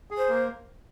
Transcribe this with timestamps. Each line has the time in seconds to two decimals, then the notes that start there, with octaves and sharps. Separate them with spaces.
0.11 G#4
0.17 C5
0.29 A#3